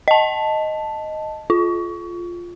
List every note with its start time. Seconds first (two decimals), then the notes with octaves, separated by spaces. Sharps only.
0.08 D#5 A5
1.50 F4